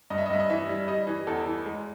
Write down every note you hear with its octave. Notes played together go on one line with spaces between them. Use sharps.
G2 D#5
E5
D#5
G2 E5
D#5
E3 E5
G3
G3 D#5
E3
E2 A4
E3
G#3